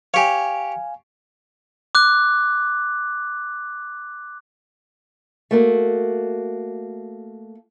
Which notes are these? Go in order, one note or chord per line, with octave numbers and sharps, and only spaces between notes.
G4 C#5 F5 G#5
D6 F#6
A3 A#3 F#4